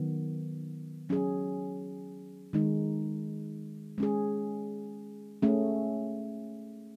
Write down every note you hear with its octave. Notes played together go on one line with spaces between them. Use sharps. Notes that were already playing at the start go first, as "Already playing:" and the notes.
Already playing: D#3 F#3 B3
F#3 C#4 G#4
D#3 G#3 D#4
G#3 C#4 G#4
A3 C#4 G#4